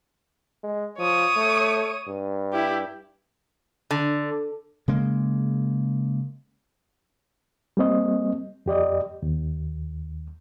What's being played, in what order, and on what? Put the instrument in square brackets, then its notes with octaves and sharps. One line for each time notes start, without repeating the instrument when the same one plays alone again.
[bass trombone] G#3
[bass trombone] F3 [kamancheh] C#5 D#6
[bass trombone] A3
G2
[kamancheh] E4 G4
[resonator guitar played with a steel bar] D3
[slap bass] C#3 G#3 A#3
[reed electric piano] G3 A#3 C4 D#5
F2 G4 D5 D#5
D#2